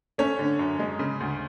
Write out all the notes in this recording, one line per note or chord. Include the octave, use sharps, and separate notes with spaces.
A3 C#4 C#5
D3
F#2
G#3
C#3
D2